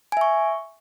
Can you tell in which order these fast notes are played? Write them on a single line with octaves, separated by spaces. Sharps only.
G#5 E5 C#6